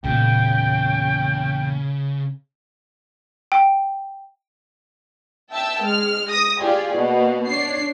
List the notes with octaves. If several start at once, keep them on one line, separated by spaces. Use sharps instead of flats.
E2 A#2 C#3 G5
G5
E5 G5 A5 E6
G#3 F6
D#6 A#6
F4 G4 G#4 D5
B2 A#3
D4 C#5 C7